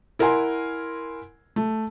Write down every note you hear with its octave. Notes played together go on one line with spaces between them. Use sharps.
E4 A#4 F#5 G#5 C6
A3